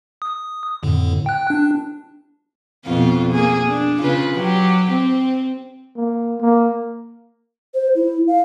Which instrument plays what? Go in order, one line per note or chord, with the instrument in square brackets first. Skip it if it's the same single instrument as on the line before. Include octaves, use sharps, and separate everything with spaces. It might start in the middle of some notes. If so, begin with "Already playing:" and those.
[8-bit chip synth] D#6
F2 A2 D3
G5 F#6
D4
[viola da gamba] F2 B2 F4
A#3 G#4
D4
C#3 F4 B4
F#3 G4
C4
[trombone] A#3
A#3
[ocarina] C5
E4
F5